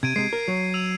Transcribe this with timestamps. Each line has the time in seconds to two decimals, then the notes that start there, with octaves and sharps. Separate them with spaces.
0.03 C3 G#6 D7 D#7
0.16 C3 G#3 C7
0.33 A#4
0.48 F#3
0.74 E6 D#7 F7